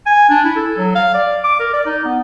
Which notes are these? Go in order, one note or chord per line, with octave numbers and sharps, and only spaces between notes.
G#5
D4
E4
A4
F#3
F5
D5
D6
A#4
D5
D#4
B3